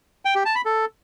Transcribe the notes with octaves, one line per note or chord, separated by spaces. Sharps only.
G5
G4
A5
B5
A4